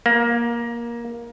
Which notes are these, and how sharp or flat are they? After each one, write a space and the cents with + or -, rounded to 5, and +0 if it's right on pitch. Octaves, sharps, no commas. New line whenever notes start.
A#3 +15